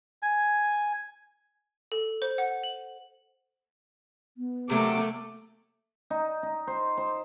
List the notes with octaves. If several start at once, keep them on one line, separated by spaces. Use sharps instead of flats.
G#5
A4
C5
F#5
F#7
B3
C3 F#3 A3 A#3 D6
D#4
D#4
C5
C5